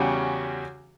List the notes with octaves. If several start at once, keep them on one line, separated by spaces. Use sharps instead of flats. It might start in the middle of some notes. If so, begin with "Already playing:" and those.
Already playing: E2 C#3 G3 C#4 F#4